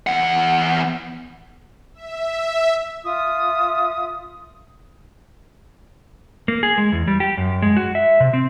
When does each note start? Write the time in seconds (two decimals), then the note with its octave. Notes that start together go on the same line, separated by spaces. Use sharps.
0.07 E2 F#5
1.94 E5
3.03 F4 E5 D#6
6.48 A#3
6.63 G#4
6.78 G#3
6.92 E2
7.08 G3
7.20 G4
7.37 F#2
7.62 G#3
7.77 F#4
7.95 E5
8.20 C3
8.33 C4